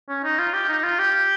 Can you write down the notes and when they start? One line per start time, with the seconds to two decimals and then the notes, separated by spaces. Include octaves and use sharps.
0.09 C#4
0.24 D#4
0.39 F4
0.53 G4
0.69 D#4
0.83 F4
0.99 G4